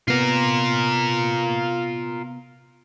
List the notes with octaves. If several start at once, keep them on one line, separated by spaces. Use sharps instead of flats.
C3 B3 F4 A#4